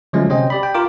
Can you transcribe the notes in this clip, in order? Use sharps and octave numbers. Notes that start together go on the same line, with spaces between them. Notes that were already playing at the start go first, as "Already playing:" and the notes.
D3 F3 F#3 G#3 A3 C#4
C3 C#4 C5 D#5 G5
G4 D5 B5
G5
F4 A#4 D6